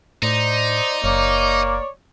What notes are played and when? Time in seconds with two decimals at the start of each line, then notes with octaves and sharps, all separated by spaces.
0.23 A2 D#4 C5 D5
1.04 F#1 A#3 C#5 D5